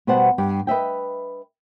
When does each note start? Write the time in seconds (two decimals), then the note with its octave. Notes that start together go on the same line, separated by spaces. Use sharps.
0.07 B2 G3 B4 C5 F#5 A5
0.38 G2 G4
0.67 B4 D#5 E5 G5